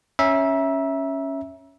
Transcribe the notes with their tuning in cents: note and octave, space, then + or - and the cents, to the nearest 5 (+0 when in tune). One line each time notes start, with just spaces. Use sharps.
C#4 +0 E5 -5 A#5 +35